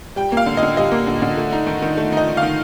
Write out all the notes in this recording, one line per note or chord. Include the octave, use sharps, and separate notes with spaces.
G3 G5
A#3 F5
D3
D#5
D3
G3 D#5
A#3
D3
D3
A3
D#4
D#3
D#3
A3
D#4 D#5
D#3
F5
D#3